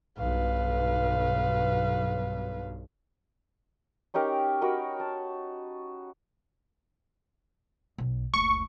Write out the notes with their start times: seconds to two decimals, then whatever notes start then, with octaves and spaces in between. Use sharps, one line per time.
0.18 B1 G2 B4 F5
4.14 C#4 D#4 G4 A#4
4.61 F#4 A#4 D#5 B5
5.00 A5
7.98 B1
8.34 F#1 D2 C#6